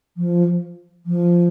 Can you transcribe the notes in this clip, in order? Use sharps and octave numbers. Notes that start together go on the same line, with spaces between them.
F3
F3